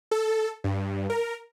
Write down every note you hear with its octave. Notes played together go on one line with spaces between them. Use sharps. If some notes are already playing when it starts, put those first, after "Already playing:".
A4
G2
A#4